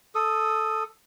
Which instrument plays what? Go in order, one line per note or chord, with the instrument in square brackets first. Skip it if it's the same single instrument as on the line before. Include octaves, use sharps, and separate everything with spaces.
[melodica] A4 D#6